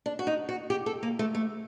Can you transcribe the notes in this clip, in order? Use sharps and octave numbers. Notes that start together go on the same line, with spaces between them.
D4
F#4
D#4
F#4
G4
A4
A#3
A3
A3